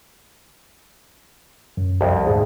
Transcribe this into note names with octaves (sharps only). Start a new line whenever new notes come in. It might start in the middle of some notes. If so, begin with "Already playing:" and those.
F#2
C2 F2
D2 G#2 G#4